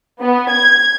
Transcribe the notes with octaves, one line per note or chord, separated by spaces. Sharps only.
B3
G#6